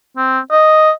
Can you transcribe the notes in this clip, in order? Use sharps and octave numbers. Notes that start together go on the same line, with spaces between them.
C4
D#5